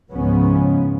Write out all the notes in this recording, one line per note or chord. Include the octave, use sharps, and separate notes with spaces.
C#2 G#2 C#3 F3 B3 C#4